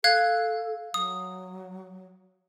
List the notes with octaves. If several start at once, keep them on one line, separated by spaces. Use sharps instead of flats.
A4 F5 F#6 G#6
F#3 D#6